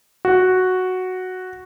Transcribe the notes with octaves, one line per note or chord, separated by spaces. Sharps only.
F#4